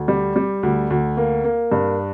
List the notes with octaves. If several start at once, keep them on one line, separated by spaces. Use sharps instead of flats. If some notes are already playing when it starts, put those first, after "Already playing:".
Already playing: D2
G3
G3
D2
D2
A#3
A#3
G2